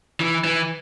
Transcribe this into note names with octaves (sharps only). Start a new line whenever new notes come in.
E3
E3